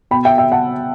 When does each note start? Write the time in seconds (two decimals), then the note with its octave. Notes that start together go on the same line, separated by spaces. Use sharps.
0.11 B2 G5 B5
0.25 E5 G5
0.38 E5 G5
0.52 F#5 A5